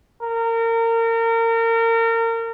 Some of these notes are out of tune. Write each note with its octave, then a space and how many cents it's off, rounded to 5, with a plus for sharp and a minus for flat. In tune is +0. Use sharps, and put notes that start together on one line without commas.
A#4 -30